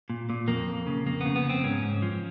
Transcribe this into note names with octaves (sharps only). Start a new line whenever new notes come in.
A#2
A#2
F2 A#3
F2
C#3
F2 A#3
C#3 B3
B3
F2 C4
G#2 C#4
G#2
F3